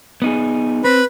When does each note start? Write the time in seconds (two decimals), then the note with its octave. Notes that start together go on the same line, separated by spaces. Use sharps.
0.22 B3 D#4 G#4
0.84 C4 B4 B5